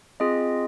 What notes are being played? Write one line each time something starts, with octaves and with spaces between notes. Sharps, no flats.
C4 F4 G#4 D#5